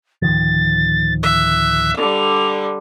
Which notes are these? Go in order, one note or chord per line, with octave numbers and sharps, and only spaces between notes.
D1 D#3 F3 A6
E5 F#6
D3 G3 F7